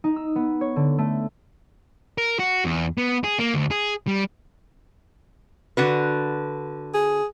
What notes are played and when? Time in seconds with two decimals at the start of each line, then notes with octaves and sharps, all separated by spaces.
0.04 D#4
0.16 E6
0.36 B3
0.61 C#5
0.76 D3
0.98 A3
2.18 A#4
2.39 F#4
2.65 E2
2.98 B3
3.24 G#4
3.39 A#3
3.54 D2
3.71 G#4
4.07 G3
5.77 D3 F#4 B4
6.94 G#4